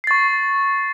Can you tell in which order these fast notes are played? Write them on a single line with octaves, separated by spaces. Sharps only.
C7 A6 C#6